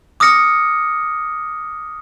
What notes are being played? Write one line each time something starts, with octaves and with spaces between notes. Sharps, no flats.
D6 D#6 F6 A#6 C#7